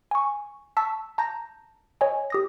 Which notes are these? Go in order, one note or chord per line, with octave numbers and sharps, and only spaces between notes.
G#5 C#6
A5 C#6 E6 B6
A5 A#5 G6 A#6
C#5 D#5 G#5
G4 D#6 A#6